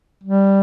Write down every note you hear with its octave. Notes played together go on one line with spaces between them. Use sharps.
G3